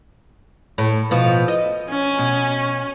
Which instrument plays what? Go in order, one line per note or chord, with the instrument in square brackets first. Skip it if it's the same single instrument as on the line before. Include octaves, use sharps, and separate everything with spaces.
[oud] A2
B2 F3
D#5
[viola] C#4
[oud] B2